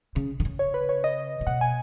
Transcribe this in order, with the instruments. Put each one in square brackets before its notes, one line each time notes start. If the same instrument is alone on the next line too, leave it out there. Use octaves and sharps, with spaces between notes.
[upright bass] C#3
D#3
C#3
[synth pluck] C#5
B4
C#5
D#5
[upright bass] C#3
[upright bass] B2 [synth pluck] F#5
[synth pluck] G#5